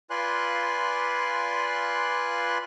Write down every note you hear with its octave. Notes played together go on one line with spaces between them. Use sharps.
F4 B4 D5 G#5 C6 F#6